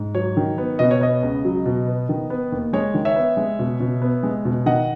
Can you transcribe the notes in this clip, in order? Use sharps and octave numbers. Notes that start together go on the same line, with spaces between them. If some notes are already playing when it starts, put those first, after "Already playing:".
Already playing: G#2
F#3 C#5
D#3
B3
B2 D#5
C#5
B3 D#5
C#2
F#3
B2
B3
D#3
B3
D#2
G#3 C#5
D#3
C#5 E5
B3
G#3
B2
B2
B3
G#3
B2
D#3 D#5 F#5